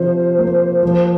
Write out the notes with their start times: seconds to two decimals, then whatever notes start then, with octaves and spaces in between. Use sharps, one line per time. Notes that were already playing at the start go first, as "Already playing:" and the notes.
Already playing: C3 F3 F4 C5
0.38 A#3
0.83 F3